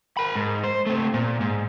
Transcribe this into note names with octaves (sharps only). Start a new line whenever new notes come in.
A#4 B5
G#2
C5
A3 C4
A#2
G#2